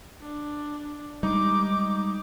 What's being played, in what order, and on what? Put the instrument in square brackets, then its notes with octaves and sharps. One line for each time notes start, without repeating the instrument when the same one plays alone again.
[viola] D4
[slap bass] G3 G#3 [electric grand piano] D#4 [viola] D6